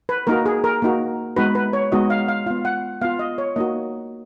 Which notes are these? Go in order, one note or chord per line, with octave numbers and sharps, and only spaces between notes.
B4
A#3 D#4 F#4 A#4
G#4
A#4
A#3 D#4 F#4
G#3 B3 D#4 F#4 B4
B4
C#5
G#3 B3 D#4 F#4 D#5
F5
F5
B3 F4 F5
F#5
B3 F4 F5
D#5
C#5
A#3 D#4 F#4 D#5